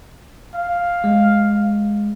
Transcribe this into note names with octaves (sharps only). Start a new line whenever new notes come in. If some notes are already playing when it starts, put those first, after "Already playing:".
F5
G#3